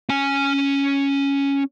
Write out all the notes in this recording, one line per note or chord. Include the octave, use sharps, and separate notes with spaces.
C#4 G#5